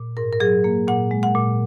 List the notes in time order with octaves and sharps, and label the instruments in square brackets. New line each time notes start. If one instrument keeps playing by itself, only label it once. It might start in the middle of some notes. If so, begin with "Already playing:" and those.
Already playing: [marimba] A#2
G#2 A#4
A#4
F#3 G#4
A#3
A#2 F#5
G#3
F#5
A#2